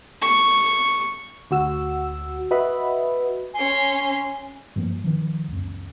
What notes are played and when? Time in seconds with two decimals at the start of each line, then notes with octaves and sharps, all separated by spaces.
0.22 C#6
1.51 D2 F#4 E6
2.51 F#4 B4 D#5 E5 B5
3.54 C#4 G#5 C6
4.76 G2 F3 A#3
5.04 D#3 F3
5.48 C#2 F#2